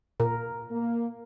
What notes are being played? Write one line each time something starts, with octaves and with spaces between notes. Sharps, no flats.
A#2 A#4
A#3